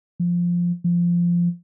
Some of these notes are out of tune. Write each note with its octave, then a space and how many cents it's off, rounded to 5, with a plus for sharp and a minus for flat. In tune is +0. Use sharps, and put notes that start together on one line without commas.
F3 +0
F3 -10